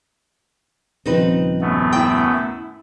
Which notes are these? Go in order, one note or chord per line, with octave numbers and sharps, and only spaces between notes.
D#1 C#3 F3 C4 D#4 B4
F#2 A3 B3
E4 G5